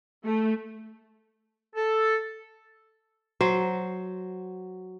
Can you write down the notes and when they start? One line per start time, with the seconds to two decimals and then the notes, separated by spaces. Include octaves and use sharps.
0.24 A3
1.76 A4
3.41 F#3 C5